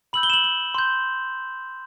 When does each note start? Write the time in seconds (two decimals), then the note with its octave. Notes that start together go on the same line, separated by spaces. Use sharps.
0.13 B5 E6 G6 F#7
0.23 G7
0.30 E7
0.33 F#7
0.44 F#7
0.75 C6 G6